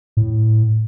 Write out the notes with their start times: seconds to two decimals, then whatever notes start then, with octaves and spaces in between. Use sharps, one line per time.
0.17 A2